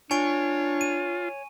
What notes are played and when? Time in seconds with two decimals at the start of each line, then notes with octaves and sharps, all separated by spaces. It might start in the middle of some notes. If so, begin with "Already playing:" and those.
0.11 D4 F4 C#5 G#5 C#6 D7
0.81 D#7